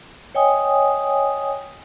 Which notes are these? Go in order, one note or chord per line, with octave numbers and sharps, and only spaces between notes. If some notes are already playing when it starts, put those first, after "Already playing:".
C#5 D#5 G5 G#5 D#6